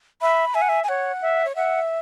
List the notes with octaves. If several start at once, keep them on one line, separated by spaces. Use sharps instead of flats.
E5 B5
E5 G#5
F#5
E5
G#5
C#5 F#5
E5
C#5
E5 F#5